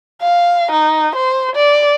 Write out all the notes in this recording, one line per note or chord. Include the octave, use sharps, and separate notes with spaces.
F5
D#4
C5
D5